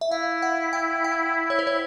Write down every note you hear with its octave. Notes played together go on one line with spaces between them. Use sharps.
E5
E4 F5
F#5
G5
G5
C#5
C5
C#5